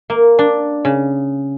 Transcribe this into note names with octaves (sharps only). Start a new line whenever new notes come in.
A#3
D4
C#3